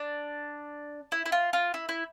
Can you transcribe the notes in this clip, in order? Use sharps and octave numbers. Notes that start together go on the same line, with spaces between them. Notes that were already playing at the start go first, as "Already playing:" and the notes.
Already playing: D4
E4
E4
F4
F4
E4
E4